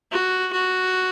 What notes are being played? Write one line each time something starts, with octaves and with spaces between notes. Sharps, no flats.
F#4
F#4